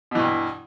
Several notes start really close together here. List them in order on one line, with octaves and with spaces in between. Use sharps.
B2 E3 G2